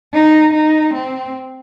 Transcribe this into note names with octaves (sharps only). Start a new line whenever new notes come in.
D#4
D#4
C4